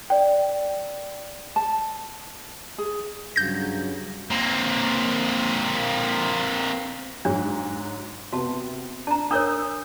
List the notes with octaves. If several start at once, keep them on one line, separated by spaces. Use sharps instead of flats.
D5 G5
A5
G#4
G2 C#3 F#3 G6 A#6
A#3 C4
G#2 F#3 D4
C3 B3 F#4 A5
D4 A5 A#5
D4 A#4 C#5 D#6 E6 G6